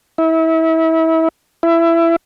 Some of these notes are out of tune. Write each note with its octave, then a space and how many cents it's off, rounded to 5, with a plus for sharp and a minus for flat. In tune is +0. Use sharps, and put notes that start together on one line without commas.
E4 -30
E4 +20